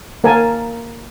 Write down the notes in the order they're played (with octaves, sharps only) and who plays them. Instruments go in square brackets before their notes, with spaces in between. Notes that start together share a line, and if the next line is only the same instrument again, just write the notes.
[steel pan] A#3 A#4 F5 G#5 A5